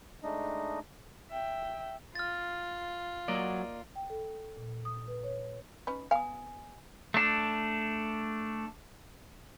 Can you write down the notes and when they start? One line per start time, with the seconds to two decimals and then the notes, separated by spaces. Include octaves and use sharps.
0.23 G#3 A3 D4 D#4 D#5
1.30 E5 G5
2.15 F4 F6 A6
3.28 F#3 A#3 D5 D#5
3.96 G5
4.10 A4
4.57 A#2
4.85 D#6
5.08 B4
5.24 C#5
5.87 C#4 D#4 B4
6.11 B3 F5 G#5 D#6
7.14 A3 D4